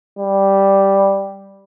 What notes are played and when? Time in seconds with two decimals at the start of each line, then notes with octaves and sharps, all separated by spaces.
0.19 G3